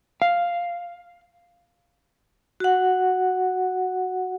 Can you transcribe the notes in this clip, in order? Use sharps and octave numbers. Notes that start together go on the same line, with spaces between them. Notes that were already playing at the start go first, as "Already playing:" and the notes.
F5
F#4 F#5